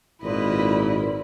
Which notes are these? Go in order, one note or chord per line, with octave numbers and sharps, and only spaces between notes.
G#1 A#2 E4 B4 D#5 B5